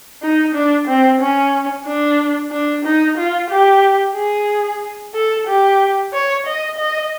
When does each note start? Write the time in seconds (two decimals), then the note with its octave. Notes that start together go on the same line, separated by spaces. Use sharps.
0.22 D#4
0.55 D4
0.87 C4
1.21 C#4
1.86 D4
2.51 D4
2.85 D#4
3.18 F4
3.50 G4
4.16 G#4
5.14 A4
5.47 G4
6.13 C#5
6.46 D#5
6.78 D#5